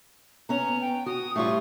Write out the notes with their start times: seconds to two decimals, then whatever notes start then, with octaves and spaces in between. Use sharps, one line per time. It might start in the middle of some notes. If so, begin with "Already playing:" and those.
0.49 B3 C#4 A#5
0.82 G5
1.06 F#4 D#6
1.36 A2 G3 F4 C#6